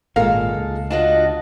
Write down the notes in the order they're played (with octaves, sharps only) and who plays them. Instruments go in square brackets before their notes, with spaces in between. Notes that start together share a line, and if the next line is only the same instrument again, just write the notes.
[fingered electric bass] G#1 A#2 [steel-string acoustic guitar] G#3 A4 [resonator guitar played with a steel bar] A#4 F5
[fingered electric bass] C#2
[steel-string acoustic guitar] D4 F4 F#4 [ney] D#5 [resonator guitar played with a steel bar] A5